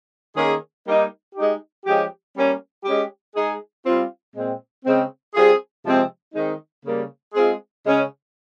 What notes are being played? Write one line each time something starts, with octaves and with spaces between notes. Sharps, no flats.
D#3 A#3 C#4 G#4
G3 A#3 D#4
G#3 D#4 G4
F3 G#3 C#4 G4
G3 A#3 C#4
G#3 C#4 G4
G#3 D#4 G#4
G3 C4 F4
A#2 G#3 C4
C#3 G#3 C4
G3 C4 F4 G#4
C3 F3 G#3 C4
D#3 G#3 C4 D#4
C#3 G3 A#3
G#3 C4 F4 G#4
C#3 G#3 C#4